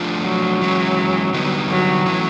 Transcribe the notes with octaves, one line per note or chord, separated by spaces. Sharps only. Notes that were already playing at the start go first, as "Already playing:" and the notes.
Already playing: F3 A3 D4 F4
F#3
E3 G#3 C#4
D3 G3 B3 D#4
F#3
E3 A3 C#4 E4